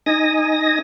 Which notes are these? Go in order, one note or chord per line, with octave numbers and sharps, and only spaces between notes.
D#4 G#5 D#6 A#6